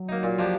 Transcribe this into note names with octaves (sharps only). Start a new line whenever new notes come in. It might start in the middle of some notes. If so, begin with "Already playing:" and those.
Already playing: F#3
A#3 D#4
A#2
F3 A#3 D4 G4